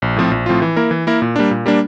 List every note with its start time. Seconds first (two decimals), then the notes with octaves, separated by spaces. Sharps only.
0.02 A#1
0.16 A2 F3 C4 F4
0.31 A#1
0.46 A2 F3 C4 F4
0.62 E3
0.76 A#3 E4 A#4
0.91 E3
1.07 A#3 E4 A#4
1.22 A#2
1.36 G3 A#3 D4
1.51 A#2
1.66 G3 A#3 D4